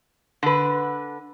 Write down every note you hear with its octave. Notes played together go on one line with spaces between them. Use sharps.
D3 B4